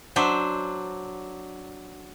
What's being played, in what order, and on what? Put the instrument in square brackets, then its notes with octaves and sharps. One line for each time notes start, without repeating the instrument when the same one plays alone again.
[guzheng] F#3 D4 C5 E5